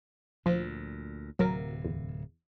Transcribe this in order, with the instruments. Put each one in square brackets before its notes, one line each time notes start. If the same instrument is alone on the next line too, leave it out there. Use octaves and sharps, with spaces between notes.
[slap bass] D2 A#2 [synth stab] F3
[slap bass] D1 C3 [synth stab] F#3 A#4
[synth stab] E2